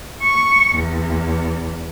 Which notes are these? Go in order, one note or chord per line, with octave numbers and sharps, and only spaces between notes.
C#6
E2